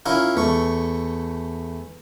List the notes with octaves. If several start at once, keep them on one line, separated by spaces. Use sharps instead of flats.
C#4 E4 F4 A#4
E2 A3 C#6